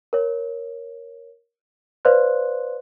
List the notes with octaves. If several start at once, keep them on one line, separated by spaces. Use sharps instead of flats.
A#4 C#5
B4 C5 D5 F5 C6 F#6